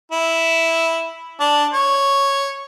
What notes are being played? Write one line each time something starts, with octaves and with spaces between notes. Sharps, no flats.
E4
D4
C#5